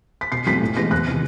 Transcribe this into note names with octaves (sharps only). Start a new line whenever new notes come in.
B6
B2 C7
F#3 A3 C4 B6
A2
E3 G#3 B3 A#6
E2 F#6
C3 D#3